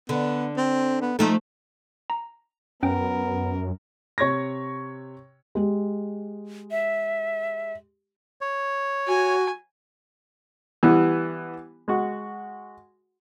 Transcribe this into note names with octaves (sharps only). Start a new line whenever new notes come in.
D3 B3
C4
B3
F3 A3 D#4 A4
A#5
F#2 B3 C#4 A#4 G5
C3 C#5 C#6 G#6 A#6
G#3 G4
E5
C#5
F#4 G#5
E3 G3 B3
G#3 F#4